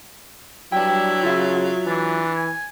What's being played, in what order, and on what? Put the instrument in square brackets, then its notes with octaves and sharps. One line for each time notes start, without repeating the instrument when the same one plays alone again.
[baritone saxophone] F#3 [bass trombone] G3 [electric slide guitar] D4 G5 [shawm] E4
[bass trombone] C#3 [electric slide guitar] F4 E5
[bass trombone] E3 [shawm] D4
[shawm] G#5